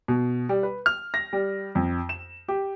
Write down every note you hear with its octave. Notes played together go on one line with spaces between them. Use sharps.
B2
G3
B4
F6
A#6
G3
F2
E7
G4